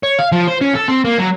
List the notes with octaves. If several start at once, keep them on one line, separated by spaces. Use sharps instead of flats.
C#5
F5
F3
C5
C#4
A4
C4
A#3
F#3